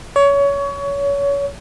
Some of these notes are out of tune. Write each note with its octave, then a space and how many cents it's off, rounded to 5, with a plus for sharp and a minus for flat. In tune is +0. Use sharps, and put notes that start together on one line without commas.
C#5 +25